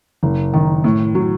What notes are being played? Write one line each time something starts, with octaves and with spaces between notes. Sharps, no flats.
F#1
D#3
A2
F#3